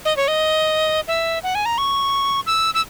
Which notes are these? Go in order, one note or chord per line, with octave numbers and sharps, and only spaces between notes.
D#5
C#5
D#5
E5
F#5
G#5
A#5
C#6
E6
E6